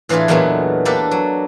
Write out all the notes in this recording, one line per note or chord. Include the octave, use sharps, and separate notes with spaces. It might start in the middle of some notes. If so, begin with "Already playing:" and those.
A2 E3 A3 D4 F4 G#4
E2 A#2 F#3 G#3 A3 B3
A#3 D4 G4 A4 B4
F#3